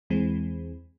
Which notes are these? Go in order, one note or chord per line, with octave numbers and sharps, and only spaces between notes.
E2 E3 G#3 C4